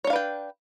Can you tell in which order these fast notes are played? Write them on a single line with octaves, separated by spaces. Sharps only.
C#5 D4 F5 B4 G5